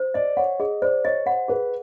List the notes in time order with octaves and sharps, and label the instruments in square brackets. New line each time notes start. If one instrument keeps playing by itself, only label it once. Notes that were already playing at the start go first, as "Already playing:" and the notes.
Already playing: [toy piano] C5
[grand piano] D5 [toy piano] D#5
[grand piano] C#5 [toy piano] F#5
[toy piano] G#4 [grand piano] D#5
[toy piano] C5 [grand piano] D5
[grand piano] C#5 [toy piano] D#5
[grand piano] C5 [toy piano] F#5
[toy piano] G#4 [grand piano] B4